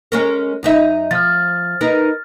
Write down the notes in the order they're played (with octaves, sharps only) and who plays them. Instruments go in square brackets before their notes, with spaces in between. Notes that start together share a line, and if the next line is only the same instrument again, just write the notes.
[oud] G#3 C#4 A#4
F#2 D#4 E5
[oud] F3 [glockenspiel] F6 A6
[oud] D#4 A#4 B4